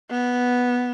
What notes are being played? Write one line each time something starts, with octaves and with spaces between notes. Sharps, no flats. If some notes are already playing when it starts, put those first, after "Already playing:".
B3